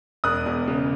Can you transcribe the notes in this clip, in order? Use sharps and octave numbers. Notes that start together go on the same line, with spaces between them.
E1 D#6 F#6
E2
C#3